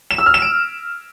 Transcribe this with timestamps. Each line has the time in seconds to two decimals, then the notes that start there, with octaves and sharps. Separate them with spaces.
0.11 E7
0.18 E6
0.26 F6
0.34 E7
0.42 D7